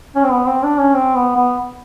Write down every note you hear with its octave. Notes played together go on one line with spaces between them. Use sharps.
C#4
C4
B3
C4
D4
C#4
C4
B3
B3